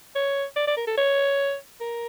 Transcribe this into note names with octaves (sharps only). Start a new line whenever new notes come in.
C#5
D5
D5
A#4
A4
C#5
A#4